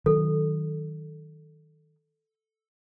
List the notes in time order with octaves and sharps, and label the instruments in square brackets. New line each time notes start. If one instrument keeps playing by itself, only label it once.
[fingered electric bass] D#3 F#3 [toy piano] A4